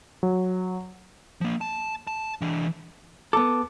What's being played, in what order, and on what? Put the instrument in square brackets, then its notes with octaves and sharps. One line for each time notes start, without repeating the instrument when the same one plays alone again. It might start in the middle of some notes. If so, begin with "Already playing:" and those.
[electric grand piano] F#3
[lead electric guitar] F3 A#3
A5
A5
E3 D4
[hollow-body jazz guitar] B3 A4 [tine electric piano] D6